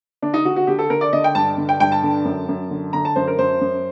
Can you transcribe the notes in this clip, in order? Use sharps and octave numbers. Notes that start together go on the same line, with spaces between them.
D3 D4
D#4
D3 F#4
F#4
D3 G4
A4
D3 A#4
D5
D3 D#5
G5
G2 A5
D3
G5
G2 G5
A5
D3
F#2
F#2
D3
D3 A#5
A5
F#2 C5
A#4
F#2 C5
F#2